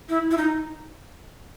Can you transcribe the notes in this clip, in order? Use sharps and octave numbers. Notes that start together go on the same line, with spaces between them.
E4
E4
D#4